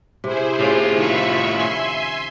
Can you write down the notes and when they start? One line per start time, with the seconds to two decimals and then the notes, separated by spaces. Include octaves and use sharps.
0.24 C3 E4 G#4 C5
0.59 A2 C3 C#4 F4
0.96 D#3 F3 E5 B5 C#6
1.54 E5 G#5 C6